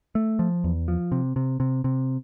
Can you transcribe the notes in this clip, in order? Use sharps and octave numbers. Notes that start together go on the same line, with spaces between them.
A3
F3
E2
F3
C3
C3
C3
C3